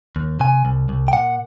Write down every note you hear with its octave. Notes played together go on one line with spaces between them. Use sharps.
D#2
C3 G#5
C2
C2
G5
A#2 F#5